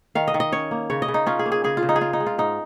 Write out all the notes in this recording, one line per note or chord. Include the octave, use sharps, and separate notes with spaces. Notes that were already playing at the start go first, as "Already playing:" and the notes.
D#3 F5
D#5
D#3
D#5
C#4 C#5
A#3
C#3 C#5
D#5
C#3
D#4
C#4 F4
G#4
A#3
G#4
C#3 G#4
F4
C#3
D#4
G#4
D#4 F4
D#4
G#3
F4
G#2 D#4